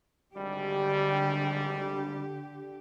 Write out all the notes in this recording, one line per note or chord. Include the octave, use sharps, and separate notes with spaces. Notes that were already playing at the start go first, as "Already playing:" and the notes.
G#1 D3 G3 G4